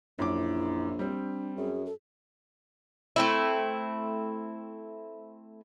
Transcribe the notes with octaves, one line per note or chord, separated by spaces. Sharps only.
A#1 F#2 E4 D6
G3 C4 D4
F#2 G#4
A4
A3 C4 E4